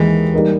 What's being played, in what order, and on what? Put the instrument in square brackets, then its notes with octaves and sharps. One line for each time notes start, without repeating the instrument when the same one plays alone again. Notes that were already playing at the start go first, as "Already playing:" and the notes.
Already playing: [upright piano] D#2 D#3 G#3 [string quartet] E3
[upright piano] G3 A#3 D#4 A#4